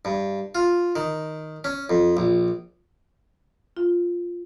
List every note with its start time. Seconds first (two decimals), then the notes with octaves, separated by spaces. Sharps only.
0.05 G2
0.55 F4
0.96 D#3
1.64 C#4
1.90 F2
2.17 A#1
3.77 F4